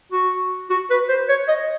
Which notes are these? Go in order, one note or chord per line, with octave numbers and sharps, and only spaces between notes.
F#4
F#4
B4
C5
C#5
D#5